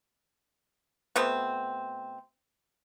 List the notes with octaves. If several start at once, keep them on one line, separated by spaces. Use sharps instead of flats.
B2 A3 B3 C4